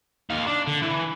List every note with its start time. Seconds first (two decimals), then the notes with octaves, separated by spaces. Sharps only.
0.30 D#2 F5
0.47 D4
0.67 D3
0.83 E3